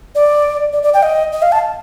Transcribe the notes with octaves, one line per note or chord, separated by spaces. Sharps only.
D5
D5
D5
G5
D#5
D#5
F5
A5